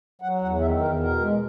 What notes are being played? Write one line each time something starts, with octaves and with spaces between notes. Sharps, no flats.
F#3 F#5
E2 F#5
D#3 E5
E2 A#4
B2 A#4
G#3